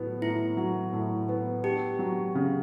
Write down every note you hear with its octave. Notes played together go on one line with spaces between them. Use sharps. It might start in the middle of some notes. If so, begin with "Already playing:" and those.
Already playing: A2 F#3 B3
A2 E4
F#3
A2
B3
D4 G4
F#3
C#3